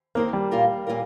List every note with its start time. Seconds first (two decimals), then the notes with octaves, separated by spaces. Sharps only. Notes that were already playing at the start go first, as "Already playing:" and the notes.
0.15 D#3 A#3 C4 G4 A#4
0.33 G3
0.51 A#2 A#3 F4 A#4
0.87 A#2 A#3 F4 A#4